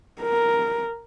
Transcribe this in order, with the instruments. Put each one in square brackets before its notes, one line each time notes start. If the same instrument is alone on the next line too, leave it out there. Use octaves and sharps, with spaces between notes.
[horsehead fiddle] A#4